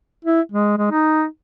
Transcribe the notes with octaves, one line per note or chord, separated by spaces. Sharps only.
E4
G#3
G#3
D#4